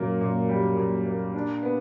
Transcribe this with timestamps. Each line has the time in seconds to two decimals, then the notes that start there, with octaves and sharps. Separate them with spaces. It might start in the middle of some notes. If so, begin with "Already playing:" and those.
Already playing: F#2 A#2 A#3
0.21 A#2
0.49 G3
0.77 A#2
1.06 A#3
1.34 D4
1.63 B3